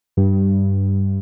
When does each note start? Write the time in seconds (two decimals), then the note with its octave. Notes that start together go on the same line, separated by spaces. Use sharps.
0.17 G2